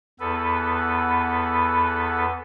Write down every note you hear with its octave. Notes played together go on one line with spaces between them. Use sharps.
E2 B3 A4 B4